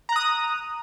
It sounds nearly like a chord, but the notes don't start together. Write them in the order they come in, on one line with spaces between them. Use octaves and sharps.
A#5 F#6 D#6